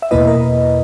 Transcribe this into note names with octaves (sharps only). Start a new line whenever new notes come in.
E5
E2 B2 A#3 E4 B4 D#5
A#4